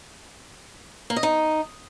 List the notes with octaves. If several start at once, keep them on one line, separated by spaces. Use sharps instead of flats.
A#3
D#5
D#4